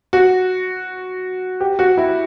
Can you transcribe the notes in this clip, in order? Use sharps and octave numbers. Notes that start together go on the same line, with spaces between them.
F#4
G4
F#4
E4